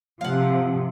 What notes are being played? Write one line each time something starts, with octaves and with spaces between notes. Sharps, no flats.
C3 F3 F5 F#5